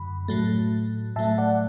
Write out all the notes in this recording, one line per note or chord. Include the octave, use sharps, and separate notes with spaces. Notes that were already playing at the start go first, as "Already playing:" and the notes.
Already playing: F#2 D3 F#3 B5
A2 F#3 A3
A2 F#3 A3 E5 A5
D5 F#5